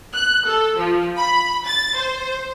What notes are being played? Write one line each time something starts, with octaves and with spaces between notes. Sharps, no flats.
F#6
A4
F3
B5
A6
C5